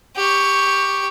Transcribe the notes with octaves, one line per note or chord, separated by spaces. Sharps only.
G4 C#6